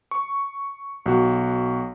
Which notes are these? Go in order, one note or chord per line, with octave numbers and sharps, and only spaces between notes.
C#6
B1 F#4